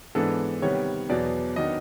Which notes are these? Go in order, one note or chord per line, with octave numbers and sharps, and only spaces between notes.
G#2 E3 G#3 B3 D4 A4
C3 D#3 G3 B3 C#5
E2 B2 F#3 D5
D#3 F#3 B3 D4 D#5